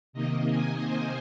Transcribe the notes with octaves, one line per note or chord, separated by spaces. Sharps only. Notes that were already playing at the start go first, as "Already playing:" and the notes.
C3 D#3 A#3 D#5
G#5
C5